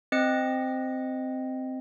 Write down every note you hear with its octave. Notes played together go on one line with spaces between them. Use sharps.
C4 D#5 C#7